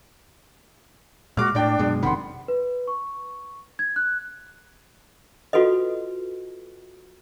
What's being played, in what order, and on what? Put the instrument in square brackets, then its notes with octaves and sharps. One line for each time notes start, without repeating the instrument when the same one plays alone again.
[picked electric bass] A#2 G#3 [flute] F#4 [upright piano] D6 F6
[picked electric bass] A2 [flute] D4 [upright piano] D5 G5
[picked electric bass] F#2 B2 G#3
[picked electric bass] F1 C3 D#3 [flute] F#5 [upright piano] B5 C6
[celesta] B4
C#6
G#6
F#6
[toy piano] F4 F#4 A4 B4 D#5